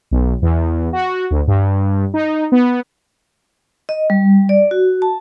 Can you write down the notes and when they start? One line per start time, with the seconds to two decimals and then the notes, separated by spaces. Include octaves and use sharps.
0.11 B1
0.42 E2
0.93 F#4
1.31 D2
1.47 G2
2.14 D#4
2.52 B3
3.89 D#5
4.10 G3
4.49 D5
4.71 F#4
5.02 A5